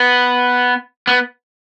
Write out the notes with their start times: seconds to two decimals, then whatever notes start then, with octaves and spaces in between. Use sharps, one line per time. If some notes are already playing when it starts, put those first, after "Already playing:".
Already playing: B3
1.07 B3